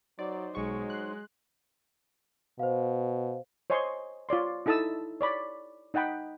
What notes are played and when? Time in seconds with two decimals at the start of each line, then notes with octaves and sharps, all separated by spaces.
0.19 F#3 D#4 C5 D5
0.55 B1 F#3 G#3 C#6
0.90 C6 F#6
2.59 B2 C5 F5
3.70 C5 C#5 D#5 G#5 C6 C#6
4.29 F4 C#5 D5 C6
4.66 D#4 E4 A4 A5 D#6 E6
5.21 C#5 D5 B5
5.94 D#4 D#5 F#5 G5 B5